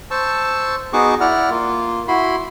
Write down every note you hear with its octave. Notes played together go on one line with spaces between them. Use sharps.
C5 A5 C#6 E6
B3 D#4 F#4 G#4 C#6 D6
E4 D5 F#5 F6
A#3 F4
E4 F#4 B5 C6